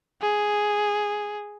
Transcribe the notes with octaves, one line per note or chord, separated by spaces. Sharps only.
G#4